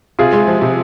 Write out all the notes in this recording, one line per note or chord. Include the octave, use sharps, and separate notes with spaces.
C3 F4 G#4
G#3
F3
C3